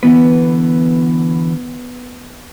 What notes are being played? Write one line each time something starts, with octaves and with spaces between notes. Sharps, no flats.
D3 E3 B3 B4